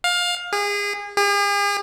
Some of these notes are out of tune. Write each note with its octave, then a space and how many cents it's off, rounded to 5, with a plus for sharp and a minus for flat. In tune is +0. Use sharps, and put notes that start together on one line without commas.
F5 +20
G#4 -30
G#4 -45